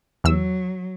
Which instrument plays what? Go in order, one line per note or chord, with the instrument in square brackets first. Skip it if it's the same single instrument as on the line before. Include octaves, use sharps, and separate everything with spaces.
[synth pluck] E2 E6 [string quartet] F#3